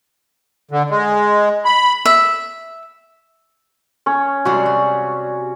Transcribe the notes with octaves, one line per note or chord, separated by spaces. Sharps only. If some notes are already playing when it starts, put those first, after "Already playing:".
D3
G#3
B5
E5
C#4 C#5
C3 G3 G#3 F#4
G3